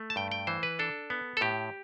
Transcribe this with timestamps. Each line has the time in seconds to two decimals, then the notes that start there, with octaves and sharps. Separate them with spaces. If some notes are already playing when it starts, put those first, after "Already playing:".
Already playing: A3
0.10 A5
0.16 G2 G5
0.32 G5
0.47 E3 C5
0.63 B4
0.79 D4 A4
1.10 B3
1.37 A4
1.41 A2 G4